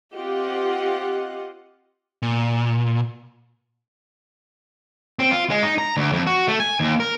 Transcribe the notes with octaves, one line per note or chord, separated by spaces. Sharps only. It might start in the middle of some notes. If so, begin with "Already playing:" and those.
C4 F4 G4 D#5 F#5
A#2
C4
F4
G#3
D#4
A#5
D2
F2
F#4
A3
G#5
D#2
A#4